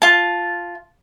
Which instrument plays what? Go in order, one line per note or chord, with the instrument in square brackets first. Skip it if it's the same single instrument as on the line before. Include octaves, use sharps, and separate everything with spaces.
[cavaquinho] F4 A5